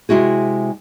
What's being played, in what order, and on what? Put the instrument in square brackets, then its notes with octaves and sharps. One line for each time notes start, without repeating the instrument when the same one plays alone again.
[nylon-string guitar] C3 G#3 E4 F#4 G#4